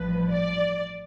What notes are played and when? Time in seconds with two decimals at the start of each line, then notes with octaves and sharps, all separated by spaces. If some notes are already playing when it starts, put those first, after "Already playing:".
Already playing: A1 G2 F3 B4
0.31 D5